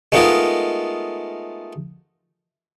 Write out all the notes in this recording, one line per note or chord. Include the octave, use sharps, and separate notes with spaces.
G#3 A3 B3 D#4 F4 A#4